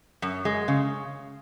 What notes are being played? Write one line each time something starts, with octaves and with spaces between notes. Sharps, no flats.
F#2
G#3
C#3